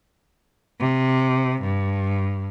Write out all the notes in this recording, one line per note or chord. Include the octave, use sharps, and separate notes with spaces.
C3
G2